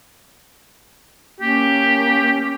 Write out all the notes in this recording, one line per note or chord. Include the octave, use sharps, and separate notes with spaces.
A#3 C#4 G4